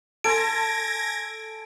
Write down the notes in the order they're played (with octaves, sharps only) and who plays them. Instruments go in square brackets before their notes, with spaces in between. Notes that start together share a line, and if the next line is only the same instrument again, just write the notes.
[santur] A4 G#5 C6 [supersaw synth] G#6 A#6 [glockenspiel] D7